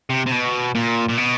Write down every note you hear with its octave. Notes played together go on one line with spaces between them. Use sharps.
C3
C3
B2
A#2
A#2
B2